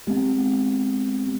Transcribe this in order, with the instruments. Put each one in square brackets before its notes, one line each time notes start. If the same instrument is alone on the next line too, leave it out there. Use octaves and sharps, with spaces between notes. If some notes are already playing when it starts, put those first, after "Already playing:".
[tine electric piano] G#3 B3 C4 G4